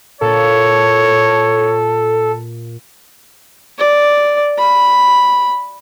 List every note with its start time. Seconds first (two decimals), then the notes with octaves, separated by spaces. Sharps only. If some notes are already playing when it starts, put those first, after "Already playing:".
0.21 A#2 A4 C#5
3.78 D5
4.58 B5